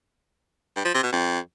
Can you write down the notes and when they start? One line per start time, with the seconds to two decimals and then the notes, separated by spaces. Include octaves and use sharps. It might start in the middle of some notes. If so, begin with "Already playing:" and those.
0.76 G2
0.85 F3
0.94 C3
1.03 B2
1.12 F2